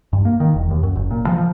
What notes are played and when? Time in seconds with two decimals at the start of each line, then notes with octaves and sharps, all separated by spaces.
0.13 G2
0.25 A#3
0.40 D#3
0.54 E1
0.71 D#2
0.83 F#2
0.96 F#1
1.11 A#2
1.27 F3
1.38 F3